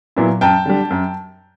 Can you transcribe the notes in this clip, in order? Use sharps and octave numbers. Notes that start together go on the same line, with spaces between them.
A#2 F#3 B3 E4
F#2 G5 A5
D3 G3
F#2